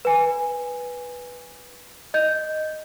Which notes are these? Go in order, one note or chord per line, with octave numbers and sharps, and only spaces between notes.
B4 G#5
D#5 G6